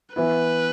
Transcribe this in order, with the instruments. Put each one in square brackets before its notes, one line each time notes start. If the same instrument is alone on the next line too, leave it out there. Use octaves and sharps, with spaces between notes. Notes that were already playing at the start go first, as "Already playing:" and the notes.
[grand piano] E3 B3 E4 [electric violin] B4